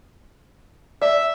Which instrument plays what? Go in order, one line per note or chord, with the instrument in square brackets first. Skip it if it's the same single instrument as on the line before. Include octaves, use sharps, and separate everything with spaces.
[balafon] D5 [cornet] E5